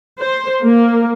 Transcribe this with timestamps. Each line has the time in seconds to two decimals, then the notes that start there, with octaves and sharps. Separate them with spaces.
0.20 C5
0.63 A#3